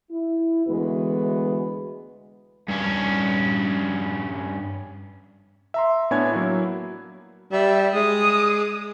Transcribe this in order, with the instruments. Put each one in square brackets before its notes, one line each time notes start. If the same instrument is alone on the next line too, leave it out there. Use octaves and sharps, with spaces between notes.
[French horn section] E4
D2 E3 G#3 B3 F#4 B4
[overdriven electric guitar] G2 C#4
[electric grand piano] E5 A#5 C6
A2 B3 D4 C#5 G#5 G#6
F#3 A#3 E4
[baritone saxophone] G3 [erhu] E5
[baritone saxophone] G#3 [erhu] D#6